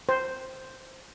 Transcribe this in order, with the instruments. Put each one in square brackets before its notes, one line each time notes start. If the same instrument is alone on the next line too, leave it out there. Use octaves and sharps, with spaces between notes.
[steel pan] C5